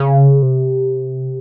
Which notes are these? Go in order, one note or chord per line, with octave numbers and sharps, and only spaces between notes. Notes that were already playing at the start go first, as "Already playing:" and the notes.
Already playing: C#3
C3